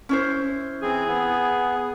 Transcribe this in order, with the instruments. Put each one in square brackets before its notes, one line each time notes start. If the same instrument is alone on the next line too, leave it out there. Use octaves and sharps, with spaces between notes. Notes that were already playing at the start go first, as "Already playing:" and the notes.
[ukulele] C#4 E4 C5
[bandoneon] E3 C4 [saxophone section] G#4
[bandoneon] B3